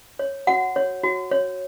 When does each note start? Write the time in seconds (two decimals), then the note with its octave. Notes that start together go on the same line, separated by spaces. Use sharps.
0.19 C#5
0.47 F#4 F#5
0.76 C#5
1.03 F#4
1.31 C#5